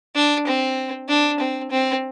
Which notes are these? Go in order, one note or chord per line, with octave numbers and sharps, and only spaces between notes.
D4
C4
D4
C4
C4